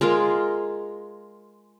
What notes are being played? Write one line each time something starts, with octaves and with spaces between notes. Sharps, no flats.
G#3 F4 A#4